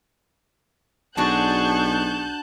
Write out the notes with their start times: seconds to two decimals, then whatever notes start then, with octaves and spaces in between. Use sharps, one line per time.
1.17 B1 D4 F#4 G#4 A5 C#6 F#6 G6